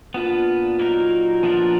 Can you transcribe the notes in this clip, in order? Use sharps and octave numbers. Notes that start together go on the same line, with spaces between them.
A#2 B3 D4 F4 B4
F#3 A#3 D#4 A#4
F3 B3 D4 F4 A#4